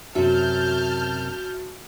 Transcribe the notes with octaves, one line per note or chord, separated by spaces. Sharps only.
F#2 C3 F#4 E5 A5 F6 G6